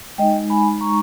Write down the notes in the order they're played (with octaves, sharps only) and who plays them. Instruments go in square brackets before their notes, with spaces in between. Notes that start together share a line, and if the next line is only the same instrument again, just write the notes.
[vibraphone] G#3 D#4 D#5 G5
G#5 B5
A#5 C#6